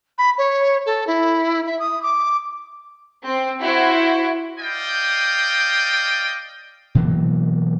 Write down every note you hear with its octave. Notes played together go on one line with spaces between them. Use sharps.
B5
C#5
A4
E4
E5
D#6
D6
C4
E4 F#4 C5
D5 D#5 F5 G5
B2 E3 F#3 A#3